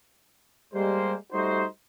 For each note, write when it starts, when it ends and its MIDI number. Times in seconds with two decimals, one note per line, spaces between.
0.74 1.14 55
0.74 1.14 56
0.74 1.14 58
0.74 1.14 72
1.33 1.65 55
1.33 1.65 57
1.33 1.65 63
1.33 1.65 66
1.33 1.65 72